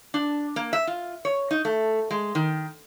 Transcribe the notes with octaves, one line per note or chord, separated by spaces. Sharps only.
D4
A#3
E5
F4
C#5
D#4
A3
G#3
D#3